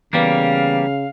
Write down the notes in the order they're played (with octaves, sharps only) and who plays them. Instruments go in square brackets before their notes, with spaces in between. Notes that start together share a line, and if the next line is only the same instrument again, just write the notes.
[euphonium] C#3 [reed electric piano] E3 B3 B4 [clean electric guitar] G3 A#3 [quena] F5